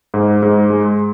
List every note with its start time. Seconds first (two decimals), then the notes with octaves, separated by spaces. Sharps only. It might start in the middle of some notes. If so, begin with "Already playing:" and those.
0.14 G#2
0.43 G#2
0.70 G#3